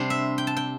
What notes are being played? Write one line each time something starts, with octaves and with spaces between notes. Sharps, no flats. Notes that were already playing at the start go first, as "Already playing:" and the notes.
Already playing: C3 G3 D4 C5
E5
G5
A5
G5